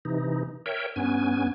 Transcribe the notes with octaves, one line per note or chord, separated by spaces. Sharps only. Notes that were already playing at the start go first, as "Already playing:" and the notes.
C3 E3 D#4
A#4 C#5 E5 G5
G2 B3 C#4 G#5